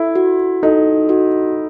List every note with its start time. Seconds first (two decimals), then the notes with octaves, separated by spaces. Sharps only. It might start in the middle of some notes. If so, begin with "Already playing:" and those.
Already playing: E4 A4
0.16 F#4
0.63 D#4 A4
1.09 F#4